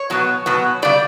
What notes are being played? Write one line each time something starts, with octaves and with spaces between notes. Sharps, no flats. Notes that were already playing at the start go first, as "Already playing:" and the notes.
Already playing: C#5
B2 F#3 B3
B2 F#3 B3
C#3 G3 D5